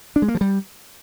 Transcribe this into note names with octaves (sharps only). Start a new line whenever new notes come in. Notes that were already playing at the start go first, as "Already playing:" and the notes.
D4
G#3
A#3
F3
G3